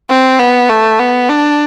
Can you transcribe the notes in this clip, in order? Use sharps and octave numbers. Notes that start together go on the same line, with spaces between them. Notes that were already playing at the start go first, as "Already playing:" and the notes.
C4
B3
A3
B3
D4